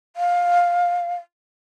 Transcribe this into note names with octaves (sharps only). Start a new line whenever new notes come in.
F5